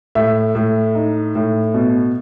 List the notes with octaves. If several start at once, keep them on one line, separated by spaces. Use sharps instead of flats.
A2 E5
A2
D#4
A2
B2